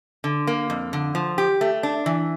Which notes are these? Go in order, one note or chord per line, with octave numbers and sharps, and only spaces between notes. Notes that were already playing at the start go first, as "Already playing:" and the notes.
D3
A#3
F2
D3
F3
G4
A3
D4
E3